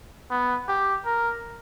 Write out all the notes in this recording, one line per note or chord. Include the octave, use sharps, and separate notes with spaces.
B3
G4
A#4